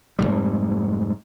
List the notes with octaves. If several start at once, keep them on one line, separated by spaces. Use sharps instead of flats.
F1 D#2 G#2 G3